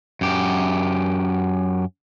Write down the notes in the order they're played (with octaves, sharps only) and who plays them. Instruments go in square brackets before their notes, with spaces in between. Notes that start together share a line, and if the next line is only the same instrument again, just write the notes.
[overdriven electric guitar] F#2 G4